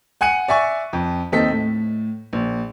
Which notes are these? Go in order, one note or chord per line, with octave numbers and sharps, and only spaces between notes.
F#5 G#5 F#6 C#7 D#7
D5 E5 G#5 C#6
F2
D#2 C4 D#4 A4 B6
A2
A#1